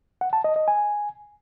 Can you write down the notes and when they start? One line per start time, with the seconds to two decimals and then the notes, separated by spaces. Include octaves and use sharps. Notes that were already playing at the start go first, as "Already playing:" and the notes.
0.21 F#5
0.33 A5
0.44 D#5
0.56 D#5
0.68 G#5